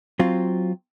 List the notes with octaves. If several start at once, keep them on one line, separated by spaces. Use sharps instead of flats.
F#3 C4 F4